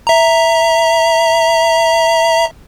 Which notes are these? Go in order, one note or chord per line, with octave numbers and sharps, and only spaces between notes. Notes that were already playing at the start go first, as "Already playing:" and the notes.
E5 A#5